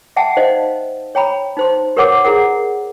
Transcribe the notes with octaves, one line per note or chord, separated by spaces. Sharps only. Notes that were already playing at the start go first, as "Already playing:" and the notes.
E5 F#5 G5 A5
D#4 C5 D5 D#5 F5
C#5 G5 A#5 B5
D#4 C5 C6
G4 A#4 B4 C#5 F#5 D6
E4 G#4 A#4 F#5